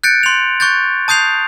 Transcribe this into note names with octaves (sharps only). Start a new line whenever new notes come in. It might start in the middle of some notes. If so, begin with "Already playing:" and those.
F#6 G6 A6 C#7 D7
C6 F7
C#6 F#6 G6 A6
A5 D#6 G6 C7 F7